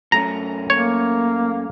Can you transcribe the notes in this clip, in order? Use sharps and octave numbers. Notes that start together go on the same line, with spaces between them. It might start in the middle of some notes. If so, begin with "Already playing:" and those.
F#2 A3 C#4 A#5
A#3 C#5